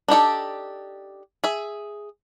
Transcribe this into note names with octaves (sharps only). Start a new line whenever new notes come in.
D4 D#4 G4 A4
G#4 E5